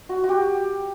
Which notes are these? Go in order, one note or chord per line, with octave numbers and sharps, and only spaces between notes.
F#4
F#4
G4